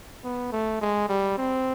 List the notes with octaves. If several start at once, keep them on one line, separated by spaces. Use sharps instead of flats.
B3
A3
G#3
G3
C4